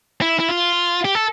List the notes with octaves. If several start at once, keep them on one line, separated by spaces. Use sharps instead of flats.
E4
E4
F4
G4
A4